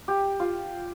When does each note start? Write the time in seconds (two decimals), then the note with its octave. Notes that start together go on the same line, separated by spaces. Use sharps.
0.08 G4
0.40 F4